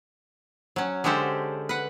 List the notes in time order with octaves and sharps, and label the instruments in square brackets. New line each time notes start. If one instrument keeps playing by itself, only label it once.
[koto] F#3 C#4
D3 G#3 C#4 G4 A4 C5
B4 F#5